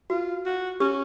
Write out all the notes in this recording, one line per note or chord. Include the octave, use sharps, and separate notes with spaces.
F4 F#4
F#4
C#4 G4